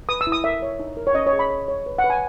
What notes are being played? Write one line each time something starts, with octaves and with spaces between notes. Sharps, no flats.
B4 D#6
E6
E4
D#6
A#4 E5
C#5
D#4
A#4
C#5
C#4 D#5
C#5
G#4
B5
C#5
C#5
B4
F#5
B4
G#5